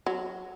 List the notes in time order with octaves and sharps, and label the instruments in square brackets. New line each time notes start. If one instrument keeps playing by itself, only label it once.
[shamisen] F#3